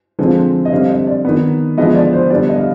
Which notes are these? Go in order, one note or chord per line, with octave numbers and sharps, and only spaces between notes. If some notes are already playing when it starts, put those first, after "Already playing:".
D3 F3 G#3 C4
D#5
D3 G3 C4 F5
D#5
D5
D#3 B3
D3 F3 G#3 B3 D#5
D5
C5
D3 G3 B3 D5
D#5
F5